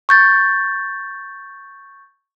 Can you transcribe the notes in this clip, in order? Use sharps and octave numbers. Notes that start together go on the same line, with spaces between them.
C#6 G6 A6